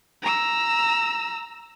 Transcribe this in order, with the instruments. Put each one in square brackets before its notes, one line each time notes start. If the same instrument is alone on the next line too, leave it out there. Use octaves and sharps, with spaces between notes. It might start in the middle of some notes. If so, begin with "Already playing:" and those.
[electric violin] A#5 E6